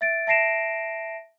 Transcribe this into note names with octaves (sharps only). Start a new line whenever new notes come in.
E5 A6 D7
E5 A5 A#6 C7 D7 E7